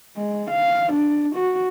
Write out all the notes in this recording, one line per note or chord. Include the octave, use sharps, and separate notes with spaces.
G#3
F5
D4
F#4